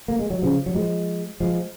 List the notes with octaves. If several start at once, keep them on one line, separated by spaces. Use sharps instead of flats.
A#3
G#3
F#3
C#3 F3
F#3
F3 G#3
F3 G#3